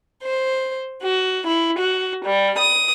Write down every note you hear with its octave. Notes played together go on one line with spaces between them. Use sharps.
C5
F#4
E4
F#4
G3
D#6